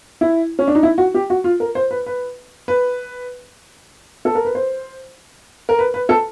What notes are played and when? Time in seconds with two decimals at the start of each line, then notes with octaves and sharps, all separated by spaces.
0.21 E4
0.59 C#4
0.68 D4
0.75 D#4
0.83 E4
0.98 F#4
1.14 G4
1.30 F#4
1.44 F4
1.60 A#4
1.75 C5
1.91 B4
2.06 B4
2.68 B4
4.25 A4
4.35 A#4
4.45 B4
4.55 C5
5.69 A#4
5.79 B4
5.94 B4
6.09 A4